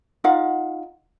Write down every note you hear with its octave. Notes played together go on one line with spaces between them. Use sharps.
D#4 F4 F5 F#5